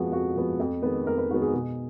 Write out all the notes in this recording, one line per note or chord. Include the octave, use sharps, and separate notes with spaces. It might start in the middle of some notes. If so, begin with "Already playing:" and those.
Already playing: F2 F3 G#3 B3 F#4
F2 F#4
F3 G#3 B3
F2
D#3 G#3 B3
F2 A#4
B4
D#3 G#3 B3 F#4
G#4
B2 G#4